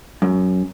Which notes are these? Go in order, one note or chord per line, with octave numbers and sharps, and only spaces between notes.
F#2